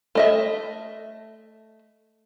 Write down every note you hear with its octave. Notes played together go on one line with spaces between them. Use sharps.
A3 D#5 E5